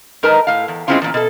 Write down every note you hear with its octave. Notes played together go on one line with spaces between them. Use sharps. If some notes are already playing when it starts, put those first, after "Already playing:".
G#2 D#4 A#4 B4 A5
A2 F5
E2
G#3 A#3 C4 C#4 E4 F4
E2 A#2
B2 A4